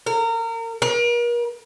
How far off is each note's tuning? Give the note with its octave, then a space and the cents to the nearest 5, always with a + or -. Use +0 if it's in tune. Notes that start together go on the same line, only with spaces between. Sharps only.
A#4 -30
A#4 +40